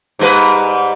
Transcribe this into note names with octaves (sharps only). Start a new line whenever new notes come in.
G#2 G3 B4